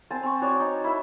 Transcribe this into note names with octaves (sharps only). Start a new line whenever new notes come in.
C4 G#5 A5
C4 C#6
F#4 C#5 D5
D#4
E4 E5 B5